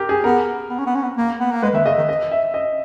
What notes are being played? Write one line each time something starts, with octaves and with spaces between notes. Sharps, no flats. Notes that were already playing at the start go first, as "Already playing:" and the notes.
Already playing: G4 A#4
G#4
B3 A#4
B3
C#4
B3
C#4
B3
A#3
B3
A#3
G#3 B4
D#3 E5
C#3 D#5
D#3
D#5
E5
D#5